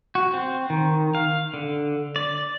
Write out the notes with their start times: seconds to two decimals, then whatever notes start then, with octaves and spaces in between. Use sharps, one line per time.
0.15 F#4
0.34 C4
0.70 D#3
1.15 F5
1.54 D3
2.16 D5